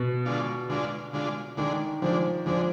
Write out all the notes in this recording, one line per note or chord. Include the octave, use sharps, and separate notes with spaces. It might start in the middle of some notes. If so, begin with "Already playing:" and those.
Already playing: B2
D3 G#3 D4 F4
D3 G#3 D4 F4
D3 G#3 D4 F4
D3 D#3 G#3 D4
D3 F3 G#3 D4
D3 F3 G#3 D4